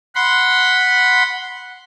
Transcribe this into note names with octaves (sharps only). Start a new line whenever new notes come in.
F#5 B5 C6